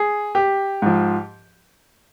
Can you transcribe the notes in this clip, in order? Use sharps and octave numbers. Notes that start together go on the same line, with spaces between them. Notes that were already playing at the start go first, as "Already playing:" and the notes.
Already playing: G#4
G4
G#2 F3